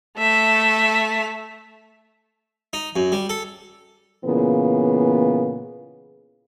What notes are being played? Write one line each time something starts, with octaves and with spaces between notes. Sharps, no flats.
A3 E5
D#4
F#2
G3
A4
A#2 C#3 E3 B3